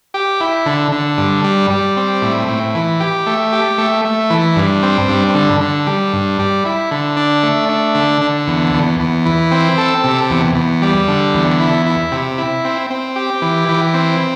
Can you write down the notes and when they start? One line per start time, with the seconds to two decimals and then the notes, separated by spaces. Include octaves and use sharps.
0.14 G4
0.41 E4
0.66 D3
0.92 D3
1.18 G2
1.44 G3
1.70 G3
1.97 C4
2.22 A2
2.48 A2
2.75 E3
3.00 G4
3.26 A3
3.52 G4
3.78 A3
4.05 A3
4.30 E3
4.56 G2
4.83 C4
5.08 G2
5.35 D3
5.61 D3
5.87 G3
6.13 G2
6.39 G3
6.65 E4
6.91 D3
7.17 D4
7.43 A3
7.69 D4
7.95 D3
8.22 D3
8.47 E2
8.74 E2
9.00 E2
9.26 E3
9.52 C4
9.78 A4
10.04 C3
10.30 E2
10.55 E2
10.82 G3
11.08 D3
11.34 E2
11.60 E4
11.86 E4
12.12 C3
12.38 E4
12.65 C4
12.90 C4
13.16 G4
13.42 E3
13.69 E3
13.94 C4